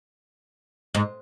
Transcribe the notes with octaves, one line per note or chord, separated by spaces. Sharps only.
G#2